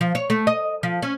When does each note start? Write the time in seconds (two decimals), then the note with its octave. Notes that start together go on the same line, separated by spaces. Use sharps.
0.01 F3
0.15 C#5
0.30 A3
0.47 D#5
0.83 F3
1.02 C#4